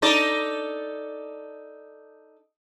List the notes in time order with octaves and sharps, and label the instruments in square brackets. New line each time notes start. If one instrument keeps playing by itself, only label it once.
[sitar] D#4 A4 D5